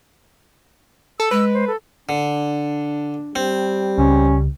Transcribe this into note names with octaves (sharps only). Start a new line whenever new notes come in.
A4 E6
G#3 B4
C5
A4
D3 D4
G3 C4
C#2 C#3 C#4